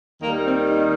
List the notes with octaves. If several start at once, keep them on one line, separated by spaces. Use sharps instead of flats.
D#2 D#3 G3 A#3
C4
D#4